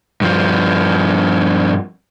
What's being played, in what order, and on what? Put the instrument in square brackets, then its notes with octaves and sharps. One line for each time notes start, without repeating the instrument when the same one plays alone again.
[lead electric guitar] G2 F3